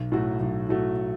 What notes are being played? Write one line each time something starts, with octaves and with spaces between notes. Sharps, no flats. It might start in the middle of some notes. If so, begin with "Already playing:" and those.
Already playing: B1
A2 F#3 A3 F#4
B1
A2 F#3 A3 F#4